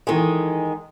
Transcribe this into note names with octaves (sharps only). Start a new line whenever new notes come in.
D#3 E3 G#3 A4 G#5